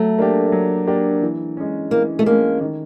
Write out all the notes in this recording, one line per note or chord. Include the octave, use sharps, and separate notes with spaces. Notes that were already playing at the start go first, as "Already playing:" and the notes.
Already playing: F#3 A3
A#3 D4 G4
F#3
A#3 D4 G4
E3
G#3 C#4
E3 A#3
A3
G#3 A#3 C#4
D#3